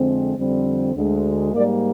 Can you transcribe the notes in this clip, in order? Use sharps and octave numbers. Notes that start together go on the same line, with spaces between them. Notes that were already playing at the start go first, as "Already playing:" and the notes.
Already playing: F2 D3 G#3 C4
F2 D3 G3 C4
D2 D3 G#3
G#2 G3 A#3 A#4 D5